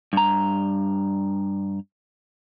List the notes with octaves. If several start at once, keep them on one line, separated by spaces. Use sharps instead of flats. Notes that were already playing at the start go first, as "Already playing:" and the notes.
G2 A#5